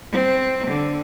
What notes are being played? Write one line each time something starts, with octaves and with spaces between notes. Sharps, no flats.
C4
D3